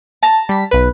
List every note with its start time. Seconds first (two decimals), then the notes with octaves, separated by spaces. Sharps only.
0.23 A5 A#5
0.49 G3 B6
0.71 B1 B4